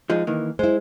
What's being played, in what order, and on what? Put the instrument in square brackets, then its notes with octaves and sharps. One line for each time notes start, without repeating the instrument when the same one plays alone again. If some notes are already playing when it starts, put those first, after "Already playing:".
[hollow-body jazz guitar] F3 G#3 D#4
D#3 E3 A#3
[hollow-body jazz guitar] G#3 [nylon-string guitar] E4 C5